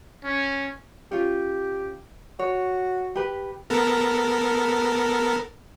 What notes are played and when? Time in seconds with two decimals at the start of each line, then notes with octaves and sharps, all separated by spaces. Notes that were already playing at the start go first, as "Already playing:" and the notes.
0.24 C#4
1.12 C#4 F4 G4
2.39 F#4 C#5
3.16 G4 B4
3.70 B3 A4 A#4